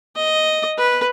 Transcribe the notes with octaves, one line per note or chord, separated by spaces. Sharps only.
D#5
B4